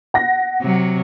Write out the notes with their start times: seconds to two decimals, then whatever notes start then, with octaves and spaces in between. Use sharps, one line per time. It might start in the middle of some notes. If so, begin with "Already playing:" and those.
0.14 F#5 A#6
0.62 C3 F#3